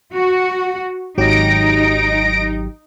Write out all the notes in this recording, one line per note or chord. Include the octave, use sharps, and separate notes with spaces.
F#4
G#1 F#3 D#4 G4 A#6 D7